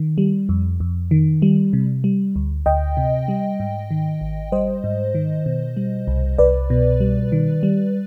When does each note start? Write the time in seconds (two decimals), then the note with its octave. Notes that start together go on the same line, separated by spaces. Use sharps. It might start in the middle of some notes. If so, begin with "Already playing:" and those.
Already playing: D#3
0.18 G3
0.49 F2
0.80 F2
1.11 D#3
1.42 G3
1.73 C3
2.04 G3
2.36 D2
2.66 D2 D#5 G5
2.97 C3
3.28 G3
3.60 G#2
3.91 D#3
4.21 G#1
4.52 G3 C5 D#5
4.84 G#2
5.15 D#3
5.46 B2
5.77 G3
6.07 C2
6.38 C2 B4 D5
6.70 B2
7.00 G3
7.32 D#3
7.63 G3